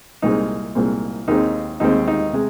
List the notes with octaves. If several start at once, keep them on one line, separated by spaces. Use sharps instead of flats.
C2 A#2 G#3 C4 D#4
C2 A#2 G#3 C4
D#2 D#3 G#3 C4 D#4
D#2 D#3 G#3 C4 D#4
D#4
C3 G#3